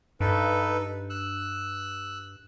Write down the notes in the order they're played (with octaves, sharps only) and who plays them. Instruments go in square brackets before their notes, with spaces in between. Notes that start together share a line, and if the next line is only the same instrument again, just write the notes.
[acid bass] G2 [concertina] D#4 A4 B4
[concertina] E6 F#6